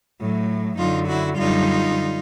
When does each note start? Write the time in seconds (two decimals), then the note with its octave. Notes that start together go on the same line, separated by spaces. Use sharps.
0.20 A2 F#3 A3
0.78 F#2 D3 F#3 D#4 F4
1.08 E4 F#4
1.37 F#2 D3 G3 D#4 F4